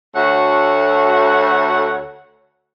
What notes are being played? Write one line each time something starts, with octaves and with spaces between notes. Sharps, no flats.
D2 A3 F#4 C#5 F#5